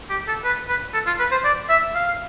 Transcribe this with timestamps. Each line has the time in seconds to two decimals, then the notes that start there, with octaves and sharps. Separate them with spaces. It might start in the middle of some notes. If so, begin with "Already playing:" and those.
0.10 G4
0.28 A4
0.44 B4
0.68 B4
0.94 A4
1.07 F4
1.20 B4
1.32 C5
1.44 D5
1.70 E5
1.95 F5